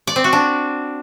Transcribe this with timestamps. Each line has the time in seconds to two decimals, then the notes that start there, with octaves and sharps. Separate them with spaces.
0.07 D5
0.16 C4
0.24 F#4
0.33 D4